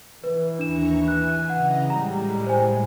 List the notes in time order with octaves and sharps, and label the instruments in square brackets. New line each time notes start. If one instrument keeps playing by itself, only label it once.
[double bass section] E3 [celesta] B4
[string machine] D#2 A#5 C#6 [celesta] D4 E7
[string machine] G#5 [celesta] F#6
[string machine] C#3 D#5 A#5 [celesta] F#5
[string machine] A2 G#3 [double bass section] G3 [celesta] A#5
[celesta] C5 G#5